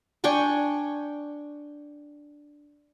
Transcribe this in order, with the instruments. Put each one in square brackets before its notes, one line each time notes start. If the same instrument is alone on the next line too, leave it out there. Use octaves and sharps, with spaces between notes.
[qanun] D4 G5 G#5 C#6